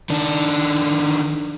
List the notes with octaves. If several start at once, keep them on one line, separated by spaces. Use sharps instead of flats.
D#3 D4